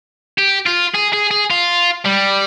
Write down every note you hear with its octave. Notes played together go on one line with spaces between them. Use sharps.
G4
F4
G#4
G#4
G#4
F4
G3